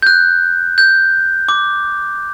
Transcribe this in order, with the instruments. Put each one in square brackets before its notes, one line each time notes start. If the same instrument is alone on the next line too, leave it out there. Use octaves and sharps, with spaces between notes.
[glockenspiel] G6
F#6
G6
D6